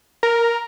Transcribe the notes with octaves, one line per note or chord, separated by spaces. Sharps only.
A#4